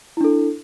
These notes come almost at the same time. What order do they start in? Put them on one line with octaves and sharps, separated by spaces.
E4 D4 A4